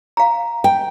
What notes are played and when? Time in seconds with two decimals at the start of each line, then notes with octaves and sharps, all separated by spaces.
0.17 F5 A#5
0.64 G5